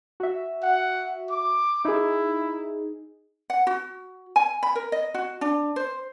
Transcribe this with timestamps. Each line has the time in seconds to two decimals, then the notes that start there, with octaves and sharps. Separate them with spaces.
0.20 F#4 E5
0.63 F#5
1.30 D6
1.85 D#4 E4 G#4
3.50 F#5
3.67 F#4
4.36 G#5
4.63 B5
4.75 A#4
4.92 D#5
5.14 F#4
5.41 D4
5.76 C5